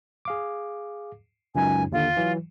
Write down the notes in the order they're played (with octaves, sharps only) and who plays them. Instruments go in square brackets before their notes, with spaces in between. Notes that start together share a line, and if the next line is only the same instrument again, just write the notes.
[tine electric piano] G#4 F5 D6
[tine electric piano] C#2 F#2 D#4 [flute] G#5
[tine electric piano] D#2 D3 [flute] F4
[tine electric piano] E3 F#3